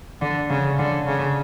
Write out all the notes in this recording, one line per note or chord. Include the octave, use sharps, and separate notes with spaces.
D3
C#3
D3
C#3